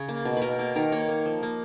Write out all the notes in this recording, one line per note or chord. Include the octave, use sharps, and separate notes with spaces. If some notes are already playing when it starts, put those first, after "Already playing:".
Already playing: C#3 C#5
A#3
B2
B4
B2 A#4
A#3
D#3 A#4
A#3 C#5
A#3
F3
A#3